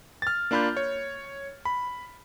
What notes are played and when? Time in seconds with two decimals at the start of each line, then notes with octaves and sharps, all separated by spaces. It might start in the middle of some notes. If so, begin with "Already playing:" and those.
0.22 F6 A6
0.51 A#3 D4 F4 B5 F6 G6
0.77 C#5
1.65 B5